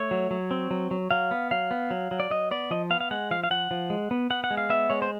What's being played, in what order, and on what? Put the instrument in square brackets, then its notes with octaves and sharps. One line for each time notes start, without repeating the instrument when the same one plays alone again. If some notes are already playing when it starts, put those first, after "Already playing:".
Already playing: [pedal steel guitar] A3 C#5
F#3
F#3
C4
F#3
F#3
F#3 F5
B3
F#3 F5
B3
F#3
F#3
D5
F#3 D#5
B3 D5
F3 D#5
B3 F5
F5
G#3 F#5
F3 F5
F5
F3 F#5
F3
G#3
B3
B3 F#5
F#5
G#3
F5
B3 E5
G#3 C#5
C5